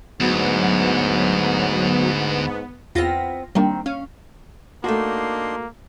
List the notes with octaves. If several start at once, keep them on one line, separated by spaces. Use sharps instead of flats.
D2 G#2 F#3 B3
E2 B3 C4 F4 A#6
D#3 G3 A#3 C4 D4
C#4 F5
A3 A#3 D4 D#4 F#4 C6